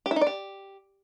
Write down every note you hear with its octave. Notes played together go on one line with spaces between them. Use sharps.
G4
E4
D#4
D5
G4